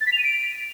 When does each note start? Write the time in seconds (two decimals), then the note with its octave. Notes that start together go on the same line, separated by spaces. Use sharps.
0.01 A6
0.07 B6
0.12 F7
0.18 D#7
0.24 D7